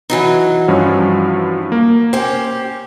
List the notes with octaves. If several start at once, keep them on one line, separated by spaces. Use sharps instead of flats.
E3 F#3 D#4
G2 F3 C#4
A#3
C#4 G4 C5